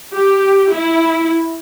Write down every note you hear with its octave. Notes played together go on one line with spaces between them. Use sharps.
G4
E4